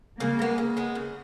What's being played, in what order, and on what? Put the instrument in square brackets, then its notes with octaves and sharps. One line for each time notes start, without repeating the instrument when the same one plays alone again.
[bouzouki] C#3 [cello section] A#3
[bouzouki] G#3 B3
C#3
G#3 B3
C#3